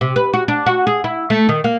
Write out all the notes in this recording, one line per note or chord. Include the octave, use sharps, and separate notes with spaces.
C3
B4
F#4
D4
F#4
G#4
E4
A3
D#3
A#3